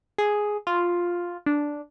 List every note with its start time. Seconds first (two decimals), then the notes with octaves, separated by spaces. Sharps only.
0.18 G#4
0.67 F4
1.46 D4